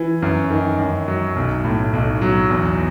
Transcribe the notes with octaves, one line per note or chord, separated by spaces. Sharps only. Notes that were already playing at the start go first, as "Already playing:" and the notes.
Already playing: E3
F#2
D#3
F#2
F#3
B1
A2
B1
F#3
E2